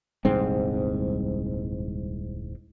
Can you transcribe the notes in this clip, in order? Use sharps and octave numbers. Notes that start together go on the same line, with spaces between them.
D#1 C2 G#2 C4